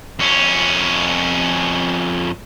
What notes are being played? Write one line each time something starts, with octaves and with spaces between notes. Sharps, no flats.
F2 C#4